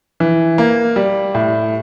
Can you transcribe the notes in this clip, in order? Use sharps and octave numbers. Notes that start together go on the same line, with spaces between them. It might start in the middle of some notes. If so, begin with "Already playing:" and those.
E3
A#3
G3
A2